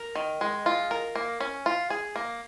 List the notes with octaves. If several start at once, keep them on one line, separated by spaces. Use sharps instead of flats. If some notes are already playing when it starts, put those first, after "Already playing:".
Already playing: A#4
D#3
G#3
F4
A#4
A#3
C#4
F4
G#4
A#3